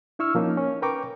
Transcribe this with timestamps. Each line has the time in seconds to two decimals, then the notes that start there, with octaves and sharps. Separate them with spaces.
0.19 D4 E4 C#6 E6 F6
0.35 F3 A#3 C#4 D#4
0.57 C#4
0.82 A#4 B4 G5 A#5 C#6 D6